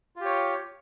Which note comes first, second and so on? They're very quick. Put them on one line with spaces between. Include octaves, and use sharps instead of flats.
F4 G4 C#5